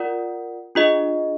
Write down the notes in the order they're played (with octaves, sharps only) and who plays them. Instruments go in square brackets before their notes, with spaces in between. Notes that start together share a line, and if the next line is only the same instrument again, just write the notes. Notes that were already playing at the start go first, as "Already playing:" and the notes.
Already playing: [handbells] F4 A#4 D5 F#5
D4 F4 G#4 D#5